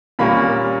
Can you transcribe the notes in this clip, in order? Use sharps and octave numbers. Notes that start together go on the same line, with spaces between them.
A#2 G3 A#3 C#4 B5